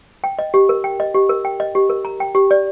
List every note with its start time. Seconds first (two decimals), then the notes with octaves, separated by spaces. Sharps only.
0.24 G5
0.39 D#5
0.54 G4
0.69 A#4
0.84 G5
1.00 D#5
1.14 G4
1.29 A#4
1.45 G5
1.60 D#5
1.75 G4
1.90 A#4
2.05 A#5
2.20 G5
2.35 G4
2.51 D5